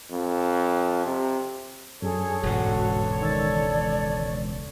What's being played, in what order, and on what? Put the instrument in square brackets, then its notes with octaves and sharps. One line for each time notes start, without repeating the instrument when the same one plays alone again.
[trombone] F2
C3
[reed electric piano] F#2 [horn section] D4 A4 C#5 [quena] G#4
[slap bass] E1 C#2 [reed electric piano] G#2 [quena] F#4
[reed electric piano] D#3 E6 A6 [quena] D5